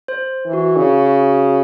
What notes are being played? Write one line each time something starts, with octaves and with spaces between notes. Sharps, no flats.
C5
E3
F#4
C#3